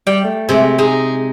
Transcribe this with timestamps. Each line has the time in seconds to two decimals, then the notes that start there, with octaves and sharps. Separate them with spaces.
0.07 G3 G5
0.24 A3
0.49 C3 G#3
0.78 G#3 D#4 G#4